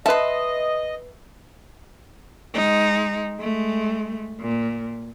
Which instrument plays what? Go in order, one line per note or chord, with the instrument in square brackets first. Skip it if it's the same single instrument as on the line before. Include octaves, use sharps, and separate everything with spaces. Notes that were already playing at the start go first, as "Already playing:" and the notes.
[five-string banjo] B4 A5 [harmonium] D#5 [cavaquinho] E5 C6
[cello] G#3 D#4
G#3 A3
A#2